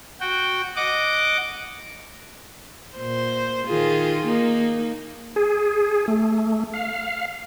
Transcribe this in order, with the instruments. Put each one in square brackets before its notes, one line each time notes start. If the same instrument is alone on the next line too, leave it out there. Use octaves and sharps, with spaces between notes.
[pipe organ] F#4 G5
D#5 F#5 D6
[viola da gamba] A#2 C5
D#3 F4 G#4
A#3 D#4
[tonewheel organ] G#4
A3
F5